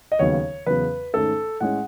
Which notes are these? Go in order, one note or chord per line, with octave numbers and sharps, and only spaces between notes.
D#5
D#2 C#3 F#3 B3 C#5
E2 C#3 F#3 B3 B4
G#2 D#3 A3 C#4 A4
A2 G#3 C#4 F#5